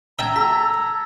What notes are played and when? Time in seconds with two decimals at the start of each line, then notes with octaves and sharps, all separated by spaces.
0.19 E5 G5 A5 A#5 E6 G#6
0.36 A4 B6